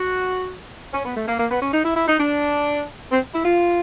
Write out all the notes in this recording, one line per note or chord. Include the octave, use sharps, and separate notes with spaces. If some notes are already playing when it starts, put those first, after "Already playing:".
Already playing: F#4
C#4
B3
A3
A#3
A#3
B3
C#4
D#4
E4
E4
D#4
D4
C4
E4
F4